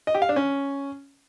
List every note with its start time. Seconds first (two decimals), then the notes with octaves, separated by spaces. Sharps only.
0.07 D#5
0.15 G4
0.22 F5
0.29 D4
0.36 C#4